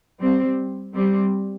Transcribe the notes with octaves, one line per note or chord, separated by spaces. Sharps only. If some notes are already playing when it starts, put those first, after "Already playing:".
G3 C4
G3 C4